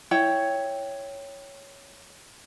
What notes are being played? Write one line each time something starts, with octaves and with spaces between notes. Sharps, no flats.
E4 C#5 G5